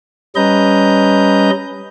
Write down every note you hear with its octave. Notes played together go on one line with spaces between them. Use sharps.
G3 C#4 B4 D#5 A#5 G6